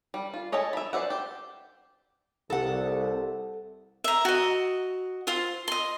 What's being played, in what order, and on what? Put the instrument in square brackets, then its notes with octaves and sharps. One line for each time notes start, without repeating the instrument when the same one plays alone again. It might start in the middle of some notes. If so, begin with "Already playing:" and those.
[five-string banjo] G3
F4
C#5 D#5 E5 G#5 A5
E5 B5
C5 D5 E5 F#5
G4
[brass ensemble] C2 [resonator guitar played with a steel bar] A4 F#5
[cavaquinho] E5 A#5
F#4 D#5
F4 C5
D#5 C6